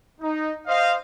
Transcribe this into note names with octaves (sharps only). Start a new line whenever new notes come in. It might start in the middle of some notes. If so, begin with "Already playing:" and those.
D#4
C5 D#5 F5